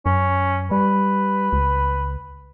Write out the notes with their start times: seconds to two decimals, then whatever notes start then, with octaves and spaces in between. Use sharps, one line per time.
0.06 F#2 C#4
0.71 G3 B4
1.53 C#2